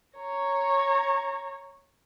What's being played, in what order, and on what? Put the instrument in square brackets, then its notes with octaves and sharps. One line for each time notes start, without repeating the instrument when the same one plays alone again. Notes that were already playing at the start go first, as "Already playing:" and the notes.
[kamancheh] C#5 A#5